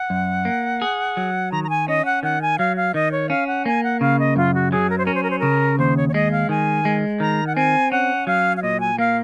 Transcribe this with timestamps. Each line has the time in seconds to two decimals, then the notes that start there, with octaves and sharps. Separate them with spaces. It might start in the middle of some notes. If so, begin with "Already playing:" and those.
Already playing: F#5
0.10 F#2
0.45 A#3
0.82 G#4
1.17 F#3
1.52 D#3 A#5
1.64 A#5
1.70 G#5
1.88 C#4 D#5
2.05 F#5
2.23 D#3 F#5
2.42 G#5
2.59 F#3 F5
2.77 F5
2.94 D#3 D#5
3.12 C#5
3.29 C#4 F5
3.47 F#5
3.66 A#3 G#5
3.84 F#5
4.01 C#3 F5
4.19 D#5
4.36 F#2 F4
4.54 F#4
4.71 F#3 G#4
4.90 A#4
4.98 C5
5.06 C#4 A#4
5.15 C5
5.23 A#4
5.30 C5
5.39 C#3 A#4
5.79 D#2 C5
5.97 C#5
6.09 C#5
6.14 G#3 D#5
6.32 F5
6.49 D#3 G#5
6.85 G#3
7.20 D#3 A#5
7.47 F#5
7.56 C4 G#5
7.92 C#4 F#5
8.27 F#3 F5
8.57 F5
8.62 A#2 D#5
8.80 G#5
8.99 A#3 F5